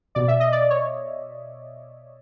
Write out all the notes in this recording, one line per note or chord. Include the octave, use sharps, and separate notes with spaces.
B2 D5
E5
D#5
D5
C#5